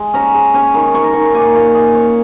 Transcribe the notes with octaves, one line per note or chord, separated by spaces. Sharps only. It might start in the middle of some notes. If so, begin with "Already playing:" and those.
Already playing: G#3
C#4 A#5
G#3
C#4 G#5
D#3
C#4 C#6
A#5
D#3 C#6
A#3 G#5
A#2 C#5
A#3 G#4
C#4 C#5